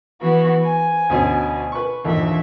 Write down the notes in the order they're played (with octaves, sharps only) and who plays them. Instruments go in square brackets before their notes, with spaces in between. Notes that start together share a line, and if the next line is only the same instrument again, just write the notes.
[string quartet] E3 B3 F#4
G#5
[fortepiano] D2 B2 C#4
B4 C#6
[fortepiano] D#2 A#2 D3 [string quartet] E3 E5